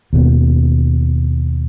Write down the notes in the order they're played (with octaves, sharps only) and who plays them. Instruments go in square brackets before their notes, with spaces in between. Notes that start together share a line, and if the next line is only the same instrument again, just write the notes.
[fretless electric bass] D#2 B2